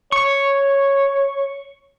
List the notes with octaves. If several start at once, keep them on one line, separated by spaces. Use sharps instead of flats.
C#5 C#6